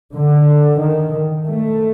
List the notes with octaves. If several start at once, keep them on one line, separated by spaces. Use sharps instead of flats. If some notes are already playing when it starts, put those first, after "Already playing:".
D3
D#3
A3